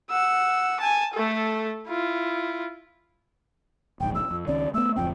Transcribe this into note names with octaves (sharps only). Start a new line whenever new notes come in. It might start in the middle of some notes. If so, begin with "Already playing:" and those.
F#5 E6
G#5 A5
A3 A4
E4 F4
D1 A#1 G#2 G5
E6
F2
C#2 D#3 C#4 D5
A3 B3 E6
D1 F2 C4 G5